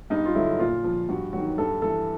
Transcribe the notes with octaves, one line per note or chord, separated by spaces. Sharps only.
G2 D#4
F4
D3 F#3 E4
A#2 F4
F3
G2 F#4
D#3 F#3 F#4
G2 A4
E3 A4